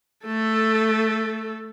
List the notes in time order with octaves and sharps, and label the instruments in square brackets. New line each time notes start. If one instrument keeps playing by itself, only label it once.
[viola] A3 A4